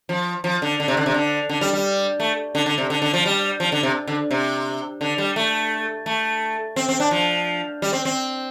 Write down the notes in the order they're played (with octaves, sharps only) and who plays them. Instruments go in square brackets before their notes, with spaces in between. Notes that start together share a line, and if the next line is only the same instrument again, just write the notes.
[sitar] F3
F3
D3
D3
C3
D3
C3
D3
D3
G3
G3
A3
D3
D3
C3
D3
D3
F3
G3
F3
D3
C3
D3
C3
D3
G3
A3
A3
C4
C4
D4
F3
G3
C4
C4